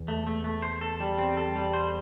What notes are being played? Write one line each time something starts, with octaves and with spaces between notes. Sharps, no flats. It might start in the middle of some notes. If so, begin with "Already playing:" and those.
Already playing: E2
A3
A3
A3
C5
A4
G3
C4
A4
G3
C5